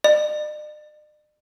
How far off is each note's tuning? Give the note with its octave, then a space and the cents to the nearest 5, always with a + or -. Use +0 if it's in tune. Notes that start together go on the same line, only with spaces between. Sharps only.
D5 +45